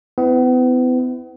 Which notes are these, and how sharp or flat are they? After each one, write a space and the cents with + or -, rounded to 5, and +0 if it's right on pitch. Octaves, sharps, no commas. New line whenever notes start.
B3 +40 E4 +0